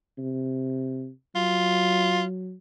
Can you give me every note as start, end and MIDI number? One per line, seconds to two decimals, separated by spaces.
0.18 1.10 48
1.35 2.54 54
1.35 2.23 65